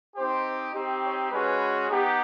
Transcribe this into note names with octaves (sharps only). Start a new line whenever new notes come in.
C4 D#4 G4 C5
C4 D#4 G4
C#5
G#3 C#4 F#4 B4
B3 D#4 G4